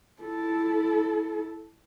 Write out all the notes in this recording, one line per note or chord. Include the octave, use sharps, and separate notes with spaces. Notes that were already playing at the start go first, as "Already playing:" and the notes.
E4 A4